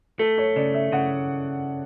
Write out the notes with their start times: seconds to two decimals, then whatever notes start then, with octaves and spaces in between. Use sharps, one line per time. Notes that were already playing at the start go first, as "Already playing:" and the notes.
0.19 A3 A4
0.38 C#5
0.56 C#3 D5
0.74 E5
0.92 C#3 F#5